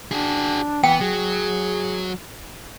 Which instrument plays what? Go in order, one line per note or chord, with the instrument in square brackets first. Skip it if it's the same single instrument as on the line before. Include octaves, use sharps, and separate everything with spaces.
[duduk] D4 [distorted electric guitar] F#4 G#4
[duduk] E3 [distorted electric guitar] B3 [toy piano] G5
[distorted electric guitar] F#3 [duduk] G#4